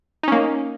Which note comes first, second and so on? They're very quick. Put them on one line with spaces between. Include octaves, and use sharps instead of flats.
D#4 C#4 A#3